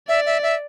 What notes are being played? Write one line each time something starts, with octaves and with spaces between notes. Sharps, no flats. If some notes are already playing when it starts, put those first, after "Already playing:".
D5 E5
E5
E5